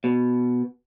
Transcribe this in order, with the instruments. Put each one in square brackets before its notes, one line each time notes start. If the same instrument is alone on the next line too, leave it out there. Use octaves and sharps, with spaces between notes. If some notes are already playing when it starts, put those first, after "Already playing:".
[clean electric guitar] B2